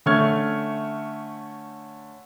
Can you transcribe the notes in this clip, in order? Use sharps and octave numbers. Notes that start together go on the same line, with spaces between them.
D3 A3 C#4 C#6 F6 G#6